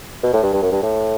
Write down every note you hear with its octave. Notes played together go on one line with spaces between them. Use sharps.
B2
A2
G2
G2
F#2
G2
A2